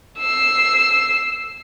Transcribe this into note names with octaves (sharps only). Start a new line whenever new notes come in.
E6 C7